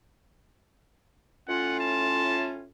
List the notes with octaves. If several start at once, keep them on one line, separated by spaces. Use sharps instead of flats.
A2 C#4 F4 F#5
A5